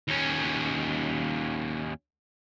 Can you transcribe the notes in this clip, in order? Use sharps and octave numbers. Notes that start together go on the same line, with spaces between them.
D#2 C#4